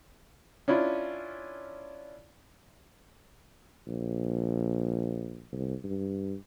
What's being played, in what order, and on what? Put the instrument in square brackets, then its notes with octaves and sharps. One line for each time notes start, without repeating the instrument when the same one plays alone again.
[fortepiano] C#4 D4 E4 F4
[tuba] A#1
C2
G2